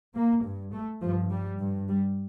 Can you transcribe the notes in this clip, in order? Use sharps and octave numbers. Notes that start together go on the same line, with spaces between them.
A#3
G2
A3
G2 F3
G3
G2
G3